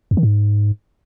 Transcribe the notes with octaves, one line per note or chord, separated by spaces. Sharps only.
F2
D#3
G#2